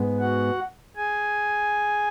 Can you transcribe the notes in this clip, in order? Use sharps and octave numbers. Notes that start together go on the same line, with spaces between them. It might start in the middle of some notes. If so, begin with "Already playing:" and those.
Already playing: G#2 G#3 B3
F#4 F#5
G#4 G#5